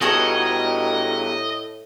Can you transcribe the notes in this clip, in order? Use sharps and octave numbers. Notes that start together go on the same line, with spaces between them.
A2 G3 B3 F#4 G#4 A4 D#5